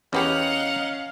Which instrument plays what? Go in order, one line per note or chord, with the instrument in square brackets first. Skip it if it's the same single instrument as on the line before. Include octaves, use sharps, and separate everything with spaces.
[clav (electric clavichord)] E2 B3 G4 [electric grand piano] C#4 [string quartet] D#5 F#5 A#5 [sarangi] F5